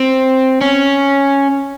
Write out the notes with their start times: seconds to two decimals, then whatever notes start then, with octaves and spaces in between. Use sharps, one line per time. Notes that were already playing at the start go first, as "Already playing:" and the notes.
Already playing: C4
0.61 C#4